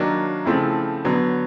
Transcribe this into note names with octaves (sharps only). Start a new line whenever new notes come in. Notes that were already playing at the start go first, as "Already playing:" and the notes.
Already playing: D#3 F#3 A#3 D4
C#3 F3 A3 C4 E4
D3 F#3 B3